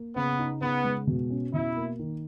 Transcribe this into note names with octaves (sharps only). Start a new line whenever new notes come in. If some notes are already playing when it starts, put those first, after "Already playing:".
Already playing: A#3
C#3 B3
D#4
C#3 B3
G#3
B2
C#4
B2 E4
A#3
D#3